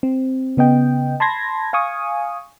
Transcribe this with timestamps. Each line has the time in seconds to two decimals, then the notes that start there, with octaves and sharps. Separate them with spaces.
0.03 C4
0.57 C#3 B3 D#5 G5
1.20 A5 B5 C6 G#6 A#6
1.73 F5 G#5 C#6 D#6